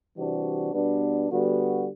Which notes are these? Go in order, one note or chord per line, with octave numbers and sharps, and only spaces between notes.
C3 E3 G3 D4 F#4
B2 G3 B3 D4
D3 G3 B3 F#4